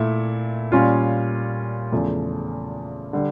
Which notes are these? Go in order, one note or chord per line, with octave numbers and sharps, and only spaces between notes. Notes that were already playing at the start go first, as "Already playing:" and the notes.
Already playing: A#2 A3 E4
A#2 G3 C#4 F4
E2 C#3 F3 A3
D3 G3